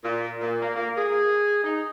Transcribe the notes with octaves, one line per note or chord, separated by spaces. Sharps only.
A#2
A#2
A#3
A#3
G#4
D#4